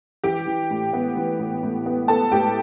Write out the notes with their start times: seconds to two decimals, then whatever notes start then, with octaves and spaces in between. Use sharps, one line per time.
0.24 E3 G4 G5
0.47 E3
0.71 A2
0.93 B3
1.17 E3
1.39 A2
1.63 A2
1.86 B3
2.08 B3 A4 A5
2.32 A2 G4 G5